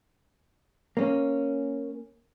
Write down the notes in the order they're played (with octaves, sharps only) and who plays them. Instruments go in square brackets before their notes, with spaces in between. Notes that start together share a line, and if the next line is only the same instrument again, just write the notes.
[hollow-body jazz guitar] A#3 C#4